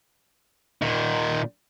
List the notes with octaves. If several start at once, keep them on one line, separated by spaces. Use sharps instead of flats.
A#2 D#3